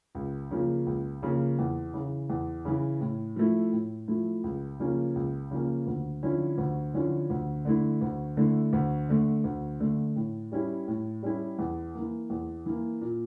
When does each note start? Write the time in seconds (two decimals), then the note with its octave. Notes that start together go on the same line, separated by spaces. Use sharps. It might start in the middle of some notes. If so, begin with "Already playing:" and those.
0.15 C#2
0.51 C#3 F3 A#3
0.86 C#2
1.22 C#3 F3 A#3
1.59 E2
1.94 C#3 E3
2.30 E2
2.65 C#3 E3
3.01 A2
3.36 F3 A3 E4
3.73 A2
4.08 F3 A3 E4
4.44 C#2
4.80 C#3 F3 A#3 C#4
5.15 C#2
5.51 C#3 F3 A#3 C#4
5.87 D2
6.23 D3 F3 C#4 E4
6.58 D2
6.94 D3 F3 C#4 E4
7.30 D2
7.65 D3 A3 E4
8.01 D2
8.37 D3 A3 E4
8.73 D2
9.09 D3 A3
9.44 D2
9.80 D3 A3
10.16 A2
10.52 G3 C#4 E4 G4
10.88 A2
11.23 G3 C#4 E4 G4
11.59 E2
11.95 E3 A#3
12.30 E2
12.66 E3 A#3
13.01 A#2